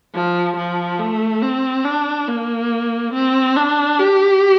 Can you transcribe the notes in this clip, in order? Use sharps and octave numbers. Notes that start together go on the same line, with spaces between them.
F3
F3
A3
C4
D4
A#3
C4
D4
G4